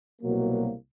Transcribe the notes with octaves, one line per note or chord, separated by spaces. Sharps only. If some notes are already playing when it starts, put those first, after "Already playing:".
C2 B2 F#3 A#3